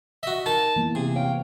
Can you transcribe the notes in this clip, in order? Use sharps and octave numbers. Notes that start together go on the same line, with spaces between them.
F#4 D#5 E5
D#4 A#4 A5
E3 A#3 B3
C3 G#4
C#5 F5 G5